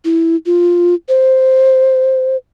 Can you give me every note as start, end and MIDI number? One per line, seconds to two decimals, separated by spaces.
0.05 0.36 64
0.46 0.95 65
1.09 2.37 72